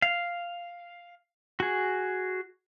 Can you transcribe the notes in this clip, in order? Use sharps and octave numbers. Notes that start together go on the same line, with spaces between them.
F5
F#4 G#4